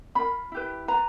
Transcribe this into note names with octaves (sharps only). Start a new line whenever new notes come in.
C#4 F4 A#4 B5
E4 G4 B4
F4 G#4 B4 A#5